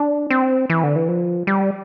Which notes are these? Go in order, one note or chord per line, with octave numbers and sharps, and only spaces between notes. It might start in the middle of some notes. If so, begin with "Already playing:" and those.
Already playing: D4
C4
E3
D3
E3
F3
G3